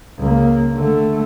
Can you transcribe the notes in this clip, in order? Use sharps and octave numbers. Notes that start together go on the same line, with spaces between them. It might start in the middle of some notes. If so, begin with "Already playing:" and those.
C#2 A#3
D3 A3